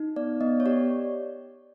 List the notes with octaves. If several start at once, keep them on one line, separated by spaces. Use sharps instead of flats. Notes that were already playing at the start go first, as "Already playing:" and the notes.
Already playing: D#4
B3 D5
B3 D#5
C#5
G4 D5